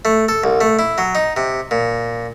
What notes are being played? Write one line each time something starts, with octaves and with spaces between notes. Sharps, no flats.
A3
A4
C2
A3
E4
F#3
D#4
C3
A#2